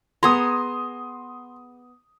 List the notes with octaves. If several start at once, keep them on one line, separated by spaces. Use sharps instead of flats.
B3 G#4 A#5 C6 D#6